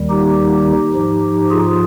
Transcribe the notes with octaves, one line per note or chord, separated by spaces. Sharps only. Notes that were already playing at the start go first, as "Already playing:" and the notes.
Already playing: D#2 D#3 G3
D#4 G4
G#2 F3
F4 G#4